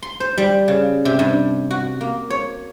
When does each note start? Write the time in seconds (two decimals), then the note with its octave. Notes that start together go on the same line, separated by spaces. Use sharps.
0.03 C6
0.20 C5
0.38 G3
0.68 C#3
1.05 C3
1.19 G2
1.71 F#4
2.01 A#3
2.30 C#5